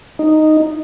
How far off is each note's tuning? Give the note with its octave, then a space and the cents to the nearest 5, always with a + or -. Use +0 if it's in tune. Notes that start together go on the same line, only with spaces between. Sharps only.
D#4 -5